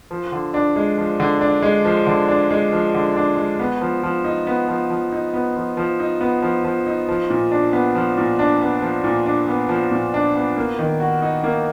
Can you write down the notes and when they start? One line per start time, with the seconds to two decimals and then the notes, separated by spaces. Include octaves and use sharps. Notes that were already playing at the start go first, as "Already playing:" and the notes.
0.11 F3
0.32 D3
0.54 D4
0.76 G#3
0.98 F3
1.20 D3
1.41 D4
1.63 G#3
1.85 F3
2.07 D3
2.29 D4
2.51 G#3
2.73 F3
2.95 D3
3.16 D4
3.37 G#3
3.59 B3
3.81 F3
4.03 F3
4.24 D#4
4.47 B3
4.68 F3
4.90 F3
5.12 D#4
5.34 B3
5.56 F3
5.77 F3
5.99 D#4
6.21 B3
6.42 F3
6.64 F3
6.86 D#4
7.09 F3
7.30 A#2
7.52 D4
7.73 B3
7.95 F3
8.17 A#2
8.39 D4
8.61 B3
8.82 F3
9.04 A#2
9.26 D4
9.48 B3
9.69 F3
9.92 A#2
10.14 D4
10.35 B3
10.57 A#3
10.79 D#3
11.00 F#4
11.22 D#4
11.44 A#3